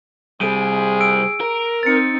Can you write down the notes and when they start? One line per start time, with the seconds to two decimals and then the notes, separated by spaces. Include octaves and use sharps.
0.41 C3 G3 G#4 D7 D#7
1.00 E6 D7
1.41 A#4
1.83 C4 D#4 A6 C#7